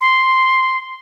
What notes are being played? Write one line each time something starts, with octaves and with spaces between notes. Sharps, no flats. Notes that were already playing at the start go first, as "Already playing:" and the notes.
C6